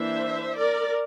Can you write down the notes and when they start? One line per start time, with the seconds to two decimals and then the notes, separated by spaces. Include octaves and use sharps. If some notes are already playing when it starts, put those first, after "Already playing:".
Already playing: E3 A#3 D4 C5 E5
0.57 A#4 D5